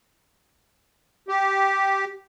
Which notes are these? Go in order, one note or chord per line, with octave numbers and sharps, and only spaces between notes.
G4